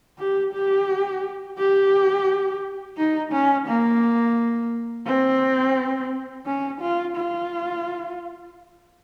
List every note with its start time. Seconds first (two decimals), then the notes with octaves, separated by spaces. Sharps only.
0.19 G4
0.53 G4
1.58 G4
2.97 D#4
3.33 C#4
3.68 A#3
5.07 C4
6.46 C#4
6.81 F4
7.16 F4